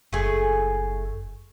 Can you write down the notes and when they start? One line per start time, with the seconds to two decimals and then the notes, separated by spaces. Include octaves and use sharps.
0.13 F#1 A3 G#4